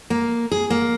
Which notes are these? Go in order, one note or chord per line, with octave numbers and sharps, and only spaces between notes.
A#3
G#4
A#3